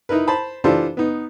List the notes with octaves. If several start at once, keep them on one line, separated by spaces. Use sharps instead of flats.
D#4 E4 A#4 B4
C5 A5 B5
E3 D4 F4 G4 A4 C5
B3 D#4